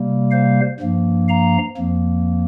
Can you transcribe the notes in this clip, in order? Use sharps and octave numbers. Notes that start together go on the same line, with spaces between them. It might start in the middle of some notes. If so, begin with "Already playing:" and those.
Already playing: C3 G3 A#3
C5 F5
G2 F3 A#3
F5 A#5
F2 F3 A#3